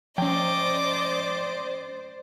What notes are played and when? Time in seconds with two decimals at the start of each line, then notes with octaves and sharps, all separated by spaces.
0.18 F3 C#4 C5 D5 D#5 G5 D6